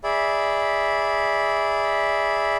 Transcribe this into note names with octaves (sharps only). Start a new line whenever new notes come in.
G#4 D5 E5 B5